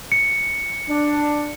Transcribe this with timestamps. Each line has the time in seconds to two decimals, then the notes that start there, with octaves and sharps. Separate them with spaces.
0.12 C#7
0.88 D4